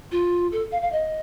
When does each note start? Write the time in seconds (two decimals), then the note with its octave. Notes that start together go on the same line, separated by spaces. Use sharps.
0.12 F4
0.52 A4
0.72 F5
0.82 F5
0.92 D#5